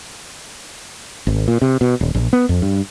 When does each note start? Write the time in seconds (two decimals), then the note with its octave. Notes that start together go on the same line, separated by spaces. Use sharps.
1.27 G#1
1.48 A#2
1.62 C3
1.81 B2
2.01 D#1
2.15 A#1
2.33 B3
2.49 F2
2.62 G2